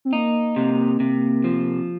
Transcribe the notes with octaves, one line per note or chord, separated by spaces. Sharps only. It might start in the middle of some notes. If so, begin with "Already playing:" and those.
C4
A#3 D#4
C3
C3
F3